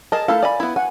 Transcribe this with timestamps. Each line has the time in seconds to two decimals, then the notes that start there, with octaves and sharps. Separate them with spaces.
0.12 G#4 A#4 D#5 A5
0.28 A3 E4 A4 F5
0.42 D5 G#5 B5
0.60 B3 E4
0.76 F#5 G#5